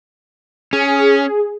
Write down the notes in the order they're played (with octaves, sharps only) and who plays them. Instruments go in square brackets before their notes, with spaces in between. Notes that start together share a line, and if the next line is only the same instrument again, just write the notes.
[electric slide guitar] C#4 [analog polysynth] G#4